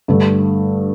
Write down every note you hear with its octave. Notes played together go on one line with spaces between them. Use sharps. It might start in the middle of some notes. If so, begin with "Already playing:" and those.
G2 D3 A3